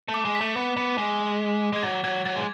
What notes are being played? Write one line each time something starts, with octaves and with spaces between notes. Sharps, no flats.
A3
D6
G#3
B6
A3
B3
B3
G#3
G#3 G#6
F#3 A6
F#3 G#6
F#3 A6
G#3